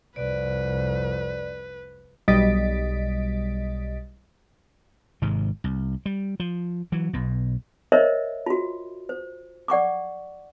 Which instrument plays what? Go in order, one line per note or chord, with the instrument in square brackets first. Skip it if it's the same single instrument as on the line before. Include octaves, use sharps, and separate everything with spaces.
[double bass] C2 F2 [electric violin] B4 [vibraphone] D5
[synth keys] B1 G3 D#5 A6 B6 D7
[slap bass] G#1 G#2 C3 G#3
C2
G3
F3
E3 F#3
B1 B2
[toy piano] A#4 C5 C#5 D#5 E5
F4 F#4
C5
D5 F#5 C#6 D6